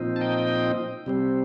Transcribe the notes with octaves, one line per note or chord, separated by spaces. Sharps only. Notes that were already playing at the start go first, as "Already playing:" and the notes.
Already playing: A#2 F3 C4 D#4
A5
D#5 G5
C3 G3 C4